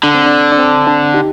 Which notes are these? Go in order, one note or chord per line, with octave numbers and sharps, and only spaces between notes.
D3 D4
C4
D4
D4
C4
D4
D#4 G4